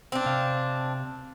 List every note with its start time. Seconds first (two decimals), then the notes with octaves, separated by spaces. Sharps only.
0.12 C4 D4
0.26 C3 F5